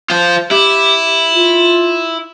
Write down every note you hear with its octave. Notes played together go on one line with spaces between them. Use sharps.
F4 C5
E4 G4
F4